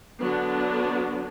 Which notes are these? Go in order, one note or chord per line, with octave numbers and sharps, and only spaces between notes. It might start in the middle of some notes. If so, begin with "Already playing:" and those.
D3 F#3 B3 D4